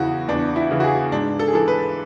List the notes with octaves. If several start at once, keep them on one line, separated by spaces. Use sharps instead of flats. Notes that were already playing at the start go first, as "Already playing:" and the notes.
Already playing: E2 C#3 E3 F#4
E2 D4
E4
C#3 E3
F#4
G#4
G#2 D4
A4
G#4
E3 A4
B4